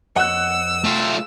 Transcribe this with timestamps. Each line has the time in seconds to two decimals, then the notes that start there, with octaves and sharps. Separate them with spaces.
0.16 F2 C#5 D#5 F#5 E6 F#6
0.84 A3 F4